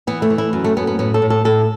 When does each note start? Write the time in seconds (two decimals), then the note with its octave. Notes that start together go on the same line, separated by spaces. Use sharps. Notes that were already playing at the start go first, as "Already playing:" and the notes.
0.07 E3 B3
0.22 A3
0.30 E3
0.38 E4
0.53 F#2
0.64 A3
0.77 F#2 B3
0.87 B3
0.99 A2 B3
1.14 A4
1.22 A2
1.30 A4
1.45 A2 A4